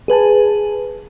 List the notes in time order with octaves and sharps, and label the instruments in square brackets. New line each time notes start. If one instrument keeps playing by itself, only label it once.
[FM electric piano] G#4 B4 G#5 A5